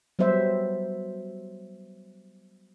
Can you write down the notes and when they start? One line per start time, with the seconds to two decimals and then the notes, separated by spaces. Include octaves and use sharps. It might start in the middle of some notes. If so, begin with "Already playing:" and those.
0.19 F#3 G3 B3 C5 E5